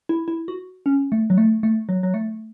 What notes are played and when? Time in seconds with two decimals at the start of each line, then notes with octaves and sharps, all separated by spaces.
0.09 E4
0.28 E4
0.48 F#4
0.86 C#4
1.12 A3
1.30 F#3
1.38 A3
1.63 A3
1.89 F#3
2.03 F#3
2.14 A3